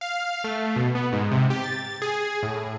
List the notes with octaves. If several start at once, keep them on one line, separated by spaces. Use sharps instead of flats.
F5
A3
B2
B3
G#2
C3
G4
A6
G#4
A2